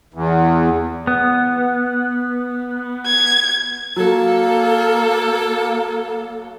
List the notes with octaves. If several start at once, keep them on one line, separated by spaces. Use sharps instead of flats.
E2
B3
G#6
F#3 A#3 A4